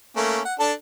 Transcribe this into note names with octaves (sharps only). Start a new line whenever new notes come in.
A3 A#3 C#4
F#5
D4 A4 A5